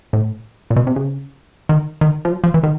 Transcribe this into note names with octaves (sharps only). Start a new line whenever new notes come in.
A2
A#2
B2
C3
C#3
D#3
D#3
F3
F#3
F3
E3
D#3